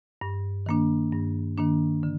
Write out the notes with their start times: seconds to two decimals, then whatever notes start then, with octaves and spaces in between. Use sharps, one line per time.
0.21 G2
0.66 D#3 A#3 D4
1.12 G2
1.58 D#3 A#3 D4
2.03 D3